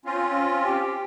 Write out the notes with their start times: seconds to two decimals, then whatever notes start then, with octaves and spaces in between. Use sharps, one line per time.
0.05 C4 C#4 F4
0.66 G4